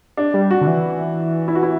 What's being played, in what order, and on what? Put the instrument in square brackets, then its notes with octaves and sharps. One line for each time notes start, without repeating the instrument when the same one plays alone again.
[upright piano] D4
[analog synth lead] G3
[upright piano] F#4
[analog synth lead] D3
E3
[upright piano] E4
F#4
E4